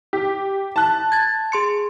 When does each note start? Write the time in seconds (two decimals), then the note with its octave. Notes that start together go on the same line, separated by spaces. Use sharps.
0.13 G4
0.76 A5 F#6
1.12 G#6 A6
1.52 G#4 C6 C#7